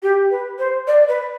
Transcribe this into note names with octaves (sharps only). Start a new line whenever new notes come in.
G4
B4
C5
D5
B4